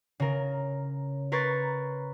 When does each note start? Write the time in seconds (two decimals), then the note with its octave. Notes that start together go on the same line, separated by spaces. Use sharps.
0.20 C#3 A#4
1.32 A#4 B4 C6 C#6 G#6 A6